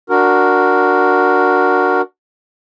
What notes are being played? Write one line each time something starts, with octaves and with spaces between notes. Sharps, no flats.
D4 F#4 A#4